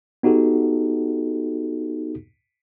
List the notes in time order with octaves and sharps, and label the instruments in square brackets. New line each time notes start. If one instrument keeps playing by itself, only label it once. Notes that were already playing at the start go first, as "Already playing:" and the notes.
[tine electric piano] B3 D#4 F#4 G4 A4